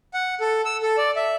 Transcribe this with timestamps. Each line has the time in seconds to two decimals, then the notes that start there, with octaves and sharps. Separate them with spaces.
0.14 F#5
0.40 A4
0.65 E6
0.83 A4
0.97 D5
1.16 E5